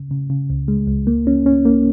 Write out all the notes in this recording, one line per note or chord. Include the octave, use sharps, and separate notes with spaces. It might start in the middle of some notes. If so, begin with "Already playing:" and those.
Already playing: C#3
C#3
C#3
C#2
G#3
C#2
A#3
C#4
C#4
A#3